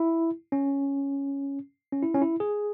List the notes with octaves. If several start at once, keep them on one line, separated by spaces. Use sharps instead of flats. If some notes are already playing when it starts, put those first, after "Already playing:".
Already playing: E4
C#4
C#4
E4
C#4
E4
G#4